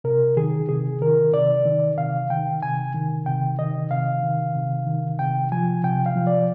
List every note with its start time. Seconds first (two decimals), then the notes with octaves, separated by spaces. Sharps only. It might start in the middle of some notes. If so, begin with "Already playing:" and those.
0.04 C3 A#4
0.37 D#3 G#4
0.69 C3 G#4
1.01 D#3 A#4
1.33 C3 D5
1.66 D#3
1.98 C3 F5
2.30 D#3 G5
2.63 C3 G#5
2.94 D#3
3.26 C3 G5
3.59 D#3 D#5
3.91 C3 F5
4.23 D#3
4.55 C3
4.87 D#3
5.19 C3 G5
5.52 F3 G#5
5.84 C3 G5
6.06 F5
6.16 F3
6.27 D5